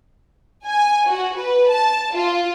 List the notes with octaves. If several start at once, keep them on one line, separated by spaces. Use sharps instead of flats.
G#5
F#4
B4
A5
F4